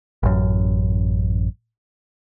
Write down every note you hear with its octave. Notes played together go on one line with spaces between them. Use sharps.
A1 F#2